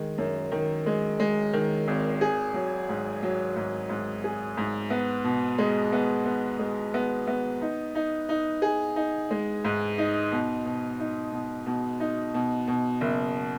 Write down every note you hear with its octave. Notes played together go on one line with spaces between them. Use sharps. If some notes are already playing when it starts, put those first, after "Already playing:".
Already playing: D#3 G#3
F#2
D#3
G#3
G#3
D#3
G#1
G#4
F#3
G#2
F#3
G#2
G#2
G#4
G#2
B3
B2
G#3
B3
B3
G#3
B3
B3
D#4
D#4
D#4
G#4
D#4
G#3
G#2
D#4
B2
B2
D#4
B2
B2
D#4
B2
B2
F#1